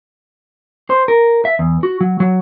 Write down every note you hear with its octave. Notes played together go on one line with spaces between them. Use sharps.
C5
A#4
E5
E2
F#4
F#3
F#3